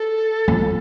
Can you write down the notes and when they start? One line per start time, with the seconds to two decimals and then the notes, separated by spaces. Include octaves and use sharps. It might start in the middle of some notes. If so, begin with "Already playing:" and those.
Already playing: A4
0.48 F2